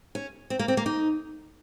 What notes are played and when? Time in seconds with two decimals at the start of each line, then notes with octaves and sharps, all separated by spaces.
0.15 C#4
0.50 C4
0.59 A#3
0.68 C4
0.77 A#3
0.86 D#4